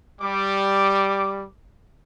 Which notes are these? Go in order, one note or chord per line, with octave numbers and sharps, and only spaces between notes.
G3 D6